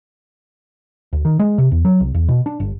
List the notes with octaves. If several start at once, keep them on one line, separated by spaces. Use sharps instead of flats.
D2
D#3
G#3
C3
E2
F#3
C2
E2
B2
D4
G1